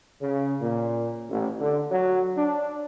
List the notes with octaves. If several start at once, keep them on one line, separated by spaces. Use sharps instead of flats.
C#3
A#2
A1
D3
F#3
D4